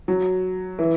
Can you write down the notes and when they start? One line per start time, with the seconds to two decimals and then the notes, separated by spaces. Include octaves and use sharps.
0.08 F#3
0.79 E3